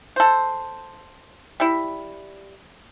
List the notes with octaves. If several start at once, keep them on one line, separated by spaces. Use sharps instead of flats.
A4 C5
G3 E4